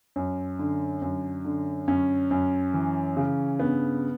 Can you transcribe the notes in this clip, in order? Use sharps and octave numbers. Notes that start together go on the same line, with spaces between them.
F#2
D3
F#2
D3
F#2 C#4
F#2
E3
C#3
G2 B3